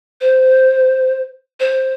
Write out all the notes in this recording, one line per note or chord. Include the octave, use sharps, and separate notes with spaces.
C5
C5